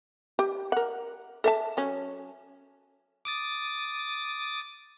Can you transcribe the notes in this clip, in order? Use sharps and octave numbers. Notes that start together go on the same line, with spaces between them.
G4
A#4 F#5
A4 E5 A5
F#3 C#4
D6 D#6 A6